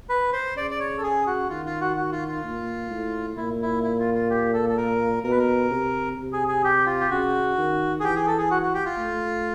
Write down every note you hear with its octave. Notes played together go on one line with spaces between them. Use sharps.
B4
C5
C#3 D5
D5
C#5
A4
G#4
F#4
D#3 F4
F4
F#4
F#4
F4
F4
A#2
A2
A#2 E4
E4
E4
F4
F4
G4
A4
A4
A#4
B2 A#4
B4
A#4
C3
C3
G#4
G#4
G4
F4
G4
C#3 F#4
D#3
G#4
E3 G4
G#4
A4
G#4
F#4
F#4
G4
F4
A3